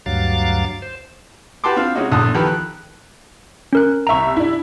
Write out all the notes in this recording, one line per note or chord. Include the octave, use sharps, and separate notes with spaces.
D2 G2 F#3 F5 D6 A6
C5
F#4 G4 B4 A5 C6 D6
C4 D4 F4 F5
C3 G#3 C#4 D#4 F#4
A#1 E2 D3 A5 D#6 F#6
D#3 F3 G4 A4 B4
F#6
C#4 A#4 F#6
C2 E5 A#5 C#6 F7
D4 E4